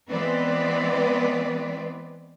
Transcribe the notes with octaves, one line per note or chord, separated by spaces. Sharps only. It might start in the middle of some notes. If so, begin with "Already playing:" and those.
E3 G#3 B3 C4 B4 D5